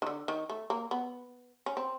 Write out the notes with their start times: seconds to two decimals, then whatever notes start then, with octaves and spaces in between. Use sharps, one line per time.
0.02 D#3
0.07 D3
0.28 D#3
0.50 A3
0.70 A#3
0.91 B3
1.66 C#4
1.77 C4